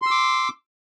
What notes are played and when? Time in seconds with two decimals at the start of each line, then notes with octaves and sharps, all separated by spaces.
0.02 C6
0.06 E6
0.11 D6